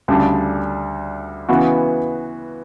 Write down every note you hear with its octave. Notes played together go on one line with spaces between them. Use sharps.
D2 C#3 G3 D4
C#3 E3 B3 F#4